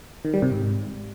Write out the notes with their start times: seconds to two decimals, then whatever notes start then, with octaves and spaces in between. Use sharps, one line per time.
0.25 D#3
0.34 G3
0.42 C3
0.51 G#2